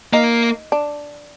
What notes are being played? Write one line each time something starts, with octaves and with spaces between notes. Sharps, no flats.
A#3 D#4
D4